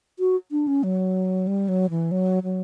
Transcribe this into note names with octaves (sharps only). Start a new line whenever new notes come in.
F#4
D4
C#4
F#3
G3
F#3
E3
F#3
F#3